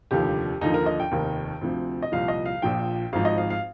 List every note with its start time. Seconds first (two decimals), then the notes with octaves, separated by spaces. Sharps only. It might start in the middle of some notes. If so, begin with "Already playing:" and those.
0.11 F1 D#2 D3 F3 G4
0.61 D#2 D3 F3 D#4
0.74 A#4
0.86 D#5
1.00 G5
1.11 F1 D#2 D#3
1.61 D2 C3 F3
2.02 D#5
2.12 C2 A#2 F3 F5
2.28 D#5
2.46 F5
2.62 A#1 A#2 F3 G5
3.13 G#1 G#2 F3 F5
3.25 D#5
3.38 F5
3.50 F5